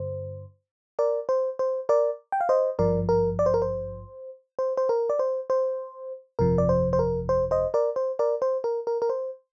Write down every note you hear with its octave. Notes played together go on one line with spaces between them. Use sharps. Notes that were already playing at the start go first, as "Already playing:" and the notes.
Already playing: G2 D3 C5
A#4 D5
C5
C5
A#4 D5
G5
F5
C5 D#5
G#1 G2 F3 A#4 D5
A#4
D5
C5
A#4
C5
C5
C5
A#4
D5
C5
C5
G1 F2 C3 F3 A#4
D5
C5
C5
A#4
C5
C5 D#5
A#4 D5
C5
A#4 D5
C5
A#4
A#4
A#4
C5